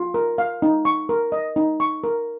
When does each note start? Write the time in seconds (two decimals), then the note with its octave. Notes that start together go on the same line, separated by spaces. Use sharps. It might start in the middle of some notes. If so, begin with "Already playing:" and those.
Already playing: F4
0.14 A#4
0.38 F5
0.62 D#4
0.85 C#6
1.09 A#4
1.32 D#5
1.56 D#4
1.80 C#6
2.04 A#4